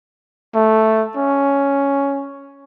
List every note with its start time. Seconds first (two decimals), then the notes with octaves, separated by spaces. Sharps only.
0.55 A3
1.17 C#4